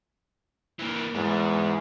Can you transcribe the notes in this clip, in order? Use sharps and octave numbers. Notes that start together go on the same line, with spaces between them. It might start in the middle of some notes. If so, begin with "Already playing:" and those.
E3 A#3
E2 G#2